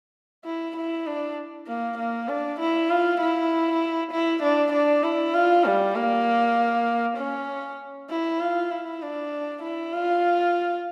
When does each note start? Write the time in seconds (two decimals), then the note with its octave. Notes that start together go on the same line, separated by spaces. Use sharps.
0.45 E4
0.76 E4
1.06 D4
1.67 A#3
1.98 A#3
2.28 D4
2.60 E4
2.90 F4
3.21 E4
4.11 E4
4.43 D4
4.73 D4
5.04 E4
5.34 F4
5.65 G3
5.95 A#3
7.17 C#4
8.10 E4
8.40 F4
8.71 E4
9.02 D4
9.63 E4
9.93 F4